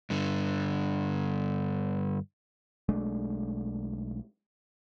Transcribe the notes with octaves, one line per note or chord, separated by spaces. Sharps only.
G2 D3
B1 G#3 A3 D4